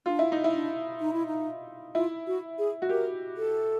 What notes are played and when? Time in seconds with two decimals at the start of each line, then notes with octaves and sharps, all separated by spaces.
0.06 D4 F4
0.19 E4
0.32 D#4
0.44 E4
0.53 D4
1.00 D#4
1.13 E4
1.27 D#4
1.95 E4 F4
2.27 F#4
2.58 G#4
2.82 F#4
2.89 G4 A#4
3.37 A4